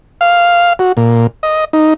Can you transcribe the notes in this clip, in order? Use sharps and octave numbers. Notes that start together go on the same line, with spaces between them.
F5
F#4
A#2
D#5
D#4